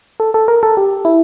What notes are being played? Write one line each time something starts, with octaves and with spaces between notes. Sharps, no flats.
A4
A4
A#4
A4
G4
E4